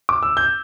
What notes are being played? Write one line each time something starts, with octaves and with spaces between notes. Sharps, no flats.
D6
E6
G6